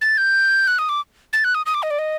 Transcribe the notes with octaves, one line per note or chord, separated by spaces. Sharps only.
A6
G6
F#6
D#6
D6
A6
F#6
D#6
D#6
D6
D#5
D5
D#5